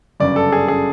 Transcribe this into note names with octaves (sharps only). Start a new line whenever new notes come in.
G1 F#2 C#3 D5
A4
G#4
C#3 G#4